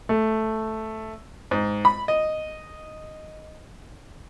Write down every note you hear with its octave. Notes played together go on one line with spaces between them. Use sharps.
A3
G#2
B5
D#5